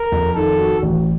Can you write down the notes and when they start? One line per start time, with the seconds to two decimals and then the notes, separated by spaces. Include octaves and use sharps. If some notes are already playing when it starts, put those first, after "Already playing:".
Already playing: A#4
0.12 F2
0.35 D#3 A4
0.59 F#4
0.82 A1